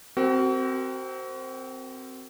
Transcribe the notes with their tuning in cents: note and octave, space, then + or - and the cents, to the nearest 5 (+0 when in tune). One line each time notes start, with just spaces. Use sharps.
C4 +0 F#4 +35 A#4 -15